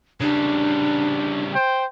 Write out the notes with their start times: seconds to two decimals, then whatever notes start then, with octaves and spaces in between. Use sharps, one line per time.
0.20 C#3 G3 D4
1.55 C5 G5